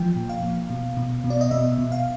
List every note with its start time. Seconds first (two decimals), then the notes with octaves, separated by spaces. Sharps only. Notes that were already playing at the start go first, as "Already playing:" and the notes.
Already playing: F3 G5
0.16 A#2
0.29 F5
0.42 A#2
0.70 B2
0.97 B2
1.24 B2
1.30 D5
1.41 D#5
1.51 B2 E5
1.78 B2
1.92 F5